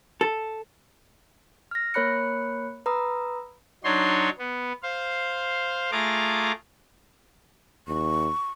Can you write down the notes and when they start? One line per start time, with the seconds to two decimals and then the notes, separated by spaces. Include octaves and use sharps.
0.21 A4
1.71 F6 A#6
1.94 A#3 A#4 C#5 B5 F#6 C#7
2.86 B4 A#5 B5 D#6 E6
3.84 F#3 D4 D#4 C#5 C6
4.39 B3
4.83 C5 F5
5.92 A3 F4 G#4 A#5 D6
7.88 D#2 C#6